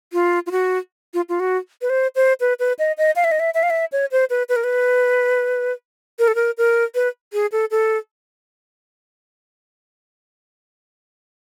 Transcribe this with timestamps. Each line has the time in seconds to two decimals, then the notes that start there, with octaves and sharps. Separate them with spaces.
0.13 F4
0.46 F4
0.51 F#4
1.14 F4
1.29 F4
1.40 F#4
1.81 B4
1.90 C5
2.15 C5
2.40 B4
2.59 B4
2.79 D#5
2.98 D#5
3.16 F5
3.24 E5
3.31 D#5
3.39 E5
3.54 E5
3.63 F5
3.70 E5
3.92 C#5
4.11 C5
4.30 B4
4.49 B4
4.56 A#4
4.64 B4
6.19 A#4
6.28 A4
6.35 A#4
6.58 A#4
6.95 B4
7.33 G#4
7.52 A4
7.71 A4